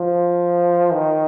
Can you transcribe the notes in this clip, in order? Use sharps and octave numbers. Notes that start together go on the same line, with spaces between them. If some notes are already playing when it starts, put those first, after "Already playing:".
Already playing: F3
D#3